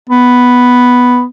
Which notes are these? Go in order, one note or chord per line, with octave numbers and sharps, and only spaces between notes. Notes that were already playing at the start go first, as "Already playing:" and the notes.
B3